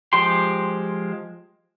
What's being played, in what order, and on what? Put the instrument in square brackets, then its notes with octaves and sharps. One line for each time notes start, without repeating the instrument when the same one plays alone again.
[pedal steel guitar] F3 G#3 G4 G5 C6